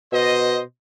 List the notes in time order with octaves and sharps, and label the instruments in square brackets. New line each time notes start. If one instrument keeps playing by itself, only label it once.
[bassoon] B2 [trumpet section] C5 D#5